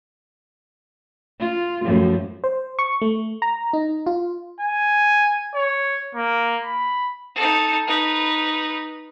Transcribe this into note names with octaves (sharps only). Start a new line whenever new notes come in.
F4
F#2 A2 F3
C5
C#6
A3
A#5
D#4
F4
G#5
C#5
A#3
B5
D#4 A4
D#4 B4